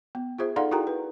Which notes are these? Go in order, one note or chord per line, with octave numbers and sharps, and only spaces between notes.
B3
F4 G#4 C5 E5
D#4 A4 D5 F5 F#5 C6
E4 F#4 G#4 A#4 G5 A#5
B4